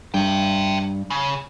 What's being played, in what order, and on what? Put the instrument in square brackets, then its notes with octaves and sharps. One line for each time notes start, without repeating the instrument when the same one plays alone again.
[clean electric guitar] G2 [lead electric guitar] E5 G5
[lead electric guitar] C#3